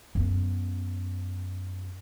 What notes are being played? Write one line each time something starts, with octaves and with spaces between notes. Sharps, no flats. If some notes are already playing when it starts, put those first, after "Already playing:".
F#2 B3